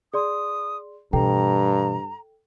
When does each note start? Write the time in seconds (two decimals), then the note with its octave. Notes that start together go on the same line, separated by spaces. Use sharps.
0.14 G#4 D5 C6 D#6
1.13 G2 B2 E3 A4 G5 A#5